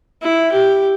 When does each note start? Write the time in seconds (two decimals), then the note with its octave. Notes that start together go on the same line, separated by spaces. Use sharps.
0.22 E4
0.53 G4